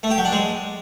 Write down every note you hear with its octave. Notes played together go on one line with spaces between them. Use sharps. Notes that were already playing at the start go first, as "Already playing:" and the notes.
A3
G4
F#3
D4
G#3